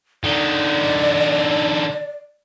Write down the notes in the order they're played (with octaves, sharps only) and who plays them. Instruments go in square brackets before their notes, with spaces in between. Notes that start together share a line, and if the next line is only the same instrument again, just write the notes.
[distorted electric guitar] D3 D#4 [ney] D5